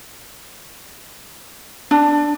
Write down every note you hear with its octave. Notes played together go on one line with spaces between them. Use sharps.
D4